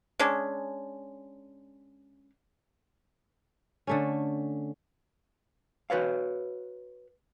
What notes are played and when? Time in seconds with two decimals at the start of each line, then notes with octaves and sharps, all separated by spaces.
0.19 G#3 C#4 D4
3.87 D3 A3 C#4
5.90 F#4 B4 C#5 F5